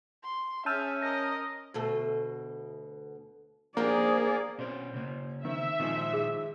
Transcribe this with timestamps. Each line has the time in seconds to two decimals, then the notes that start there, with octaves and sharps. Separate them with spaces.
0.24 C6
0.66 C#4 G#4 E5 A5 E6 F6 G6 D#7
1.02 A#4 D#5 A#6
1.74 D2 B2 A3
3.77 F3 A#3 D4 G4 G#4 D5
4.58 B2 C4 C#4 C5 D5
4.94 C#3 A#3
5.45 D#3 C4 E5
5.80 A#2 D#3 F3 G#3 D#4 C5
6.13 G#4